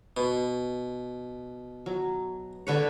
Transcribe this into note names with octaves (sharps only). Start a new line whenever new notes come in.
B2
F#3
D3 B4 C#5